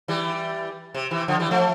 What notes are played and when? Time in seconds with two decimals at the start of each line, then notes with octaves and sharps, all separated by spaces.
0.08 E3 G3
0.94 C3
1.11 C3 E3
1.28 D3 F3
1.40 E3 G3
1.51 F3 A3